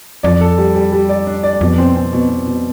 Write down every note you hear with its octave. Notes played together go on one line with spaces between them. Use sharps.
F2 D5
A4
G3
G3
G3
D5
D4
D5
F2 B2
C4
C4
B2
B2
B2